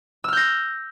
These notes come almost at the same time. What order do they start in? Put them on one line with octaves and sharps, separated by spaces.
E6 F6 G6 A#6